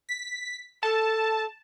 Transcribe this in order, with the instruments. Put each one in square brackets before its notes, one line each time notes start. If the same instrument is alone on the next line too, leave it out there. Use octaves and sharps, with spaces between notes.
[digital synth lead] B6
[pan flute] A4 [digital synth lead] A5